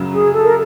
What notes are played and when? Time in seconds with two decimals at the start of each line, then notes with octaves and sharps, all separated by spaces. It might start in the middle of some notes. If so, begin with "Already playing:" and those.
Already playing: F#2 C#3 F#3
0.11 G#4
0.32 A4
0.43 A#4